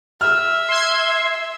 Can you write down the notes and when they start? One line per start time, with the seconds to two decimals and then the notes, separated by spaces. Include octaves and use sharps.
0.21 E5 F6
0.69 C6 G#6